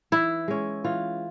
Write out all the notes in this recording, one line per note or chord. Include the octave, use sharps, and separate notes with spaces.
E3 E4
G#3 C#4
E3 F4